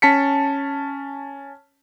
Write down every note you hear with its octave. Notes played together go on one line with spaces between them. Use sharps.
C#4 A5 B6 C#7